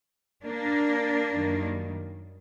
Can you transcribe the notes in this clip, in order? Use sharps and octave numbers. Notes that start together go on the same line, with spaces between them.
A#3 D4
F#2 D#3 G3